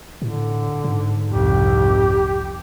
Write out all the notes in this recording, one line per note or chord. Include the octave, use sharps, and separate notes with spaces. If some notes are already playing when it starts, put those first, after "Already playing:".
A2 D3
G#2
C2 F2 G4